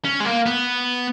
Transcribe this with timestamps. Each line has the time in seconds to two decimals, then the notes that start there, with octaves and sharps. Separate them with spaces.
0.05 C#4
0.20 G#3
0.25 A#3
0.46 B3